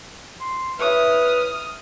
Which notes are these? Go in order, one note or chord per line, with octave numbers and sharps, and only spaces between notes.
C6
E4 B4 C#5 E5 D#6 F6